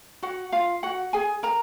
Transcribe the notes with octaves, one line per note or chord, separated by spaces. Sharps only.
F#4 F#5
F4 F5
F#4 F#5
G#4 G#5
A#4 A#5